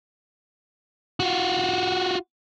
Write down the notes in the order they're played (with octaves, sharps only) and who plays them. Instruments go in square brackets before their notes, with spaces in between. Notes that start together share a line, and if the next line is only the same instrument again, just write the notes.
[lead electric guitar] F4 F#4